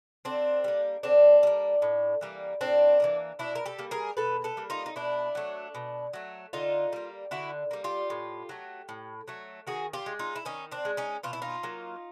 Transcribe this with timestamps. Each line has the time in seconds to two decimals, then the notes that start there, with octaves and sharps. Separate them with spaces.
0.25 D3 C4 D4
0.64 G3 A#3
1.03 D3 C4 D4
1.43 G3 A#3
1.82 A2
2.21 E3 G3 A#3
2.61 A2 C4 D4
3.00 E3 G3 A#3
3.39 B2 D4 E4
3.55 A#4
3.65 G4 A4
3.78 G3 A#3
3.91 G#4 A#4
4.17 B2 A4 B4
4.44 A4 B4
4.57 G3 A#3
4.70 D#4 F4
4.86 D#4
4.96 B2 D4 E4
5.35 F#3 A3
5.75 B2
6.13 F#3 A3
6.53 D3 D#4 F4
6.93 G3 A#3
7.31 D3 E4 F#4
7.71 G3 A#3
7.84 F4 G4
8.10 A2
8.49 F#3 A3
8.89 A2
9.28 F#3 A3
9.67 D#3 F#4 G#4
9.93 F4 G4
10.06 G#3
10.19 D#4 F4
10.36 E4
10.45 D#3 C#4 D#4
10.71 C4 D4
10.85 G#3
10.97 C#4 D#4
11.23 B2 F4
11.33 E4
11.42 D#4 F4
11.63 F#3 A#3